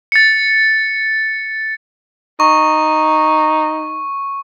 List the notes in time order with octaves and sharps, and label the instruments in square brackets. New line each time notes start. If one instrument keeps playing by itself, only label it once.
[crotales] A6 C#7
[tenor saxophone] D#4 [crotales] C#6